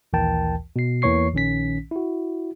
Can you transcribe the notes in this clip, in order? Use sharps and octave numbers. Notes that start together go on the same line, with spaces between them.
A#1 D#2 E3 A#4 G5 A5
B2 C7
E2 E3 A#3 C#5 C#6 C7
A#1 D#3 C#4 B6
E4 F#4